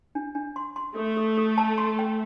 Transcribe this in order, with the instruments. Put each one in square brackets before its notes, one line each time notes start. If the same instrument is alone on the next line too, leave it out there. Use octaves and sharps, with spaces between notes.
[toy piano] D4
D4
C6
C6
[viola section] A3 [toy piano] A4
[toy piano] A4
A4
A5
C6
G5